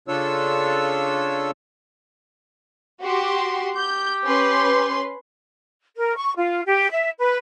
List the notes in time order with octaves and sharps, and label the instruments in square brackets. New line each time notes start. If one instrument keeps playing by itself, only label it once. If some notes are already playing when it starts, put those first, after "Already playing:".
[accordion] C#3 D4 F4 A4 C#5 E6
[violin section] F#4 G4 C6
[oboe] G4 [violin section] G6
[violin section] C#4 B4 C6
[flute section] A#4
C#6
F4
G4
E5
B4